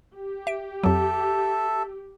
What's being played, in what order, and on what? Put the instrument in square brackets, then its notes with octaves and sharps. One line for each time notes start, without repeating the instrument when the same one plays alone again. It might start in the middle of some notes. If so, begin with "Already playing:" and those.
[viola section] G4
[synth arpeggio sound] E5 D7
[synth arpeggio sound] F2 F#3 [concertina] A4 E5